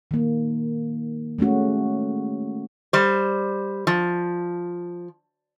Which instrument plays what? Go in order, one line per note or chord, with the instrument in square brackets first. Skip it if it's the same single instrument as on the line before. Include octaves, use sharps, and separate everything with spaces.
[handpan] D#3 A#3
G#3 A3 C#4 F#4
[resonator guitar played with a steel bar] G3 C5
F3